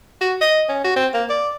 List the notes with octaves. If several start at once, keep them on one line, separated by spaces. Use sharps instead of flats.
F#4
D#5
C#4
F#4
C4
A#3
D5